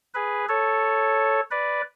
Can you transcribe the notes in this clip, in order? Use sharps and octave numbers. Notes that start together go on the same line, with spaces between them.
G#4 B4
A4 C#5
B4 D5